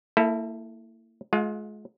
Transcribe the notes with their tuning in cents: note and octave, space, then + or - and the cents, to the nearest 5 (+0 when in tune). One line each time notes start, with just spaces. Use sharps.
A#3 -35 E4 +0 A4 +0
G#3 +35 F4 +20 F5 +45